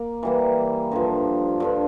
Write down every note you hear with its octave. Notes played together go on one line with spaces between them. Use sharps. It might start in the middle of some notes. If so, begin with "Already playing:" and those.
Already playing: A#3
E3 G3 A#3
G2 D3 F3
G2 D3 F3